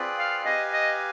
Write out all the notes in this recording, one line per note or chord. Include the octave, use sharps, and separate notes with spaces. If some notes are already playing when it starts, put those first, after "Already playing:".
Already playing: C4 F4 G#4 B4 D5
F5
G4 B4 D#5 F5 G#5
D#5